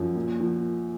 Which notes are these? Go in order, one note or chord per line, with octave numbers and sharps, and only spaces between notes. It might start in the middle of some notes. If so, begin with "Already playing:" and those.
Already playing: F#2 F3
A#2
F3